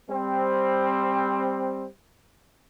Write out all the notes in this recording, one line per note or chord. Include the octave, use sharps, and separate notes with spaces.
G3 C4